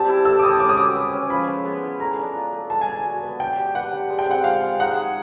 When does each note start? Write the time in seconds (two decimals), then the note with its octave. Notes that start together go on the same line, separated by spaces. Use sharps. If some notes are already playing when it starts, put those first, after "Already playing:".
Already playing: G3 C4 G4 A5
0.09 E4
0.25 A4 E6
0.39 D6
0.43 C4 D#6
0.60 C#4 D6
0.69 D#6
0.77 F#4 D6
0.95 B4
1.13 C#4
1.30 F3 B5
1.48 G#3
1.65 B3
1.82 E4
2.00 A3 A#5
2.18 D4
2.36 F4
2.53 A3
2.70 B3 A5
2.81 G#5
2.87 D4
2.93 G#5
3.05 F#4
3.23 B3
3.39 D4 G5
3.57 G4
3.75 B4 F#5
3.93 D4
4.09 G#3
4.19 G5
4.26 C4 F#5
4.44 F4 F5
4.63 G#3
4.80 D#4 F#5
4.96 G#4